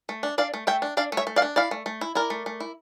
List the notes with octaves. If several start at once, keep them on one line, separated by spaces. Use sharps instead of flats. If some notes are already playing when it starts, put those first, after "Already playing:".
A3
D4
D4 D5 F5
A3
A3 E5 G5
D4
D4 D5 F5
A3
C#5 E5
A3
D5 F5
D4
E4 D5 F5
A3
A3
E4
E4 A#4 D5
A3
A3
E4